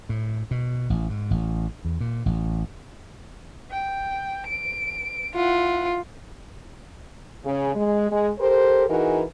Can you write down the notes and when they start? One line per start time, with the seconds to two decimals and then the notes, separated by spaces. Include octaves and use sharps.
0.09 A2
0.51 B2
0.90 A1
1.09 G#2
1.31 A1
1.85 E2
2.01 A#2
2.26 A1
3.71 G5
4.47 D7
5.35 E4 F4 F#5
7.45 C#3
7.75 G#3
8.10 G#3
8.40 G4 A4 A#4 C5
8.88 E3 D#4 F#4 G#4 A#4